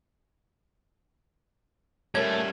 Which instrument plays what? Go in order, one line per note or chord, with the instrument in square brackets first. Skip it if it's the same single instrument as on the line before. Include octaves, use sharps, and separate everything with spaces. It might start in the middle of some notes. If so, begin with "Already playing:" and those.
[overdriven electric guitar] G3 C#4 [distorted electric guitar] A3 [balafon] A#4 C#5 [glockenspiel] G#6